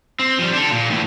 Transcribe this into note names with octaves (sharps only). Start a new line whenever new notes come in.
C4
F3 G3
D4 A4
A#2
E2 A2